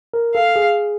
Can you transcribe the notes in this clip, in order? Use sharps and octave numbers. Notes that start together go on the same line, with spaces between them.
A#4
A4 F5
G#4